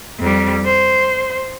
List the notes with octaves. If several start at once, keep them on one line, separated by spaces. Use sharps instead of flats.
F2 G3
C5